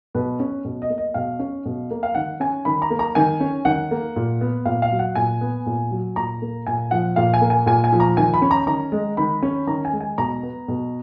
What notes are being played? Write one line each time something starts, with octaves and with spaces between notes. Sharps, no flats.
B2 B4
C#4
B2
D#5
A#3
D#5
B2 F5
C#4
B2
A#3
F5
D#3 F#5
C#4 G#5
D#3 B5
A#5
A#3
A#5
D#3 G#5
C#4
D#3 F#5
A#3
A#2
B3
A#2 F5
F5
F#3
F#5
A#2 G#5
B3
A#2
F#3
A#2 A#5
A#3
A#2 G#5
F3 F#5
A#2 F5
G#5
A#3
G#5
A#2 G#5
G#5
F3
A#5
D#3 G#5
B5
C#4
A#5
D#3 A#5
G#3
D#3 B5
C#4
D#3 A#5
G#5
G#3
G#5
B2 A#5
B3
B2